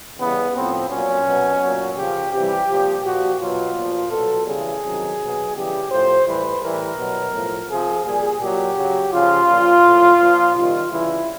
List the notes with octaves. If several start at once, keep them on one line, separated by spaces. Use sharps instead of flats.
C#3 E3 G3 B3
A2 F3 C4
A#2 F#3 C#4
B2 F#3
A#2 F#3
C#3 F3 G4
C3 E3 G3 G4
A#2 F3
A#2 F3 F#4
B2 F#3 F4
A#2 F3
B2 F#3 A4
C#3 E3 G3 G#4
C3 D#3 F#3
B2 F#3
C#3 E3 G3 G4
A2 F3 C5
A2 E3 G3 B4
A2 E3 G3 A#4
B2 F#3
A2 F3
C3 F3 G#4
A#2 G3 G#4
A#2 F#3 G4
C#3 F#3
C#3 F3 F4
A#2 F3
A2 F3
A#2 F3
C3 D#3 G3 F4
C#3 E3 G3 E4